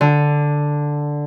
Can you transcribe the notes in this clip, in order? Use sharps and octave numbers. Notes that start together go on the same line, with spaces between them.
D3